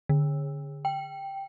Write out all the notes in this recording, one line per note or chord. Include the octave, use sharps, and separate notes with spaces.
D3
G5